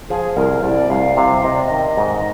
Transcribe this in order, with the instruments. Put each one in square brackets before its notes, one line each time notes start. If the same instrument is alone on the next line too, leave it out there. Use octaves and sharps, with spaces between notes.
[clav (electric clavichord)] F3 [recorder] G#4
[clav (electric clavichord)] C2 [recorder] A#4
[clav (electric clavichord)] C2 [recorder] D5
[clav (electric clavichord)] C2 [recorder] F5
[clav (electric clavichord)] C3 [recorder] F5
[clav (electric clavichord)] C3 [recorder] D#5
[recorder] D5
D#5
[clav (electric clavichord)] D#3
G#2